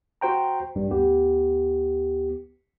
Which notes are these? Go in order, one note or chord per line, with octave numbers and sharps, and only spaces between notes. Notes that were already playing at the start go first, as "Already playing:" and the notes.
F#4 C5 G5 A#5
A1 G2 G3
D2 B3 G4